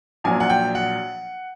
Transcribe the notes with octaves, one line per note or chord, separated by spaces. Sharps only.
A#1 A#2 F#3 G#5
F#5
G5
F#5